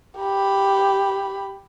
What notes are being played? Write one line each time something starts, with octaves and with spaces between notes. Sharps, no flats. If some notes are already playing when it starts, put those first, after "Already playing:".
G4 B5